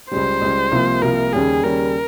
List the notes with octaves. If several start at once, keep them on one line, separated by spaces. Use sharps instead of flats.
C#2 C#3 G3 C5
C#2 C#3 G3
C2 C3 F3 A#3 F4
C2 C3 F3 A#3 F4 A#4
D#2 C#3 G3 C#4 G#4
D#2 C#3 G3 C#4 A#4